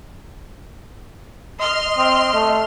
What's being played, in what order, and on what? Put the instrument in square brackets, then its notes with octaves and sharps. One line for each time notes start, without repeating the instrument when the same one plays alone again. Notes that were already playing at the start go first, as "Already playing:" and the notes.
[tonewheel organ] D#5 [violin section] C6 F6
[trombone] C4
A3